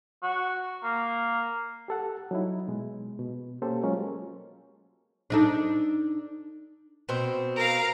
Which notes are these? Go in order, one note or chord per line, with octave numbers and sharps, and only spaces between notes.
F#4
A#3
G4 A4 F#5
F#3 D#4 E4
B2 G#3
B2
A#3 C#4 G4 A4 C5
F#3 G#3 C#4 F4 G#4 A#4
D4 D#4 A4
B2 C4
A#4 F5